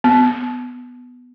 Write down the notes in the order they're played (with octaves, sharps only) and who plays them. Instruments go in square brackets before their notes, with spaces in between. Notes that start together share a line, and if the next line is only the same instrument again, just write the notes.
[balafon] B3